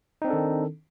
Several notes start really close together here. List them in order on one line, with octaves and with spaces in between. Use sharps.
D#4 C4 D4 A4 D#3